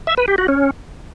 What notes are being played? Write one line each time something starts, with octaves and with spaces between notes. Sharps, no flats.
E5
B4
G4
F#4
C#4